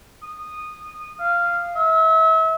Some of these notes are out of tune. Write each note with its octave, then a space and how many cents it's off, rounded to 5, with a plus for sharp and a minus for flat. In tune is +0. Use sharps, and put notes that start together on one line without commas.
D#6 -15
F5 -10
E5 -35